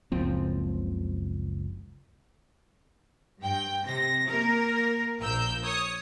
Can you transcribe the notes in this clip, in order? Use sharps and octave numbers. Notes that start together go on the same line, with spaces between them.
F#1 C#2 F3 C4
G2 G5
C3 A#6
A#3 A#4
A#1 F3 A#4 E6 G6
C#5 D#6